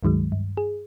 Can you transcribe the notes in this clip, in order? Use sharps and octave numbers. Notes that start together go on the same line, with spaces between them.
C#2 G2 D#3 F#3 G#3
G2
G#4